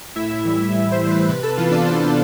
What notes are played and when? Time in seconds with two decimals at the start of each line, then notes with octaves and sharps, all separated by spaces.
0.16 A2 E4 E5
0.45 E3 G3
0.73 A2
0.92 C5
1.01 E3 G3
1.11 B4
1.29 C3 B4
1.43 A4 A5
1.57 E3 B3 F4 F5
1.71 D4 D5
1.86 C3 C5